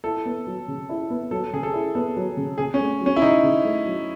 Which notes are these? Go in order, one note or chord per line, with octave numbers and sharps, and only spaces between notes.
E4 A4
B3
F#3
C#3
E4
B3
F#3 A4
C#3 G#4
A4
E4
B3 A4
F#3
C#3
C#3 G#4
C#4
A3
F#3
C#4
E4
C#3 D#4
C#3
A3
F#3